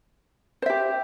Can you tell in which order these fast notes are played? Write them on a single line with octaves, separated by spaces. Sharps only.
C5 E5 G4